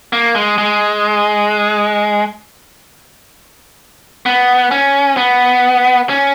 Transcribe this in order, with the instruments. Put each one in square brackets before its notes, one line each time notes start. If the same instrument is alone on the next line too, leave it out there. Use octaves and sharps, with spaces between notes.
[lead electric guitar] A#3
G#3
G#3
B3
C#4
B3
C#4